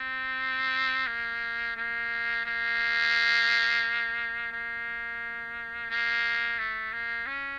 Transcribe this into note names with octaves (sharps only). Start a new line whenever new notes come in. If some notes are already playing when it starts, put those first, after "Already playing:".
Already playing: C4
A#3
A#3
A#3
A#3
A#3
A3
A#3
C#4